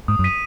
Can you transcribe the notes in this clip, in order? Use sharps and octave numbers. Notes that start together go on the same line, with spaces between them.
G#2 D#6
F#2
B6 D#7